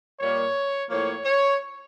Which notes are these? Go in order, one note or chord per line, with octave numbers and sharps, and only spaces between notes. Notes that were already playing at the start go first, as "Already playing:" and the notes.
A#2 G3 A#3 C#5
A2 F3 A#3 C#5
C#5